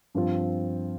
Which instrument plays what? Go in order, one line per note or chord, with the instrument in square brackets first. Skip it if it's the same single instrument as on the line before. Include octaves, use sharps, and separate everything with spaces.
[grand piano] G2 F3 C4 F4 C5